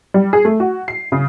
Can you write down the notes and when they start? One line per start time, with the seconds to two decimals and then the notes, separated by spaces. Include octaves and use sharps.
0.14 G3
0.33 G#4
0.45 A3
0.60 F#4
0.88 C7
1.12 C#3